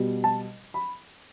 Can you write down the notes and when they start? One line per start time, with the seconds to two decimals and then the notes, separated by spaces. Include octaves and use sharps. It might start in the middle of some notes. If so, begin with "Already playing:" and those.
Already playing: B2 G3
0.24 A5
0.74 B5